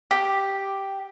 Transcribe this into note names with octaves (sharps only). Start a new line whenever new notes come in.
G4